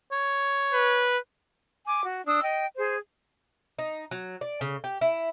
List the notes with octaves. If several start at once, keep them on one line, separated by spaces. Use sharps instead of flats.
C#5
B4
G#5 D6
F#4
D4 D#6 E6
D#5 G5
G#4 C5
D#4
F#3
D5
C#3
G4
E4